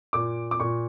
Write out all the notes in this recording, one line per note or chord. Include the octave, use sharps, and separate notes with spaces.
A#2 D6
D6
A#2 C#6